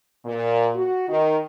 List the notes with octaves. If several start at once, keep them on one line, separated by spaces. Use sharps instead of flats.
A#2
F#4
D#3